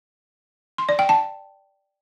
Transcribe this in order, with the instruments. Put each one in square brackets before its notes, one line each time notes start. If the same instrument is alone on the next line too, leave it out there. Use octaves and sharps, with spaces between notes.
[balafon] C6
D5
G5
A5